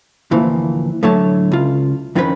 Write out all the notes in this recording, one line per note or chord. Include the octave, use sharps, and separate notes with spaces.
D2 A#2 E3 F3
A2 D3 F#3 A3 C#5 A5
C#2 F4
F2 D#3 C4 C#4 F4 B4